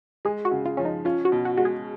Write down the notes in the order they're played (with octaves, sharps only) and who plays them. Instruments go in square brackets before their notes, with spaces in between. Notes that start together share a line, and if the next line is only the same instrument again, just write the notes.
[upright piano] G#3 [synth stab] G#4
[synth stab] F#4
[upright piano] C#3
[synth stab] F4
[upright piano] F3 [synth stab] C#4
[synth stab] D#4
[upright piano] C#4 [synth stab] F4
[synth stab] F#4
[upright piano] B2
[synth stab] F#4
[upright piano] G#3 [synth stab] F#4
[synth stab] G#4